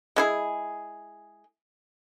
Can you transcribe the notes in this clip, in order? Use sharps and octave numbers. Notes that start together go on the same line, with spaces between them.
G#3 E4 G#4